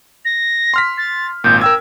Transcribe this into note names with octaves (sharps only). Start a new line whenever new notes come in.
A#6
C6 F6 B6
A6
G#1 A#2 G6
A#4 G5 E6 G#6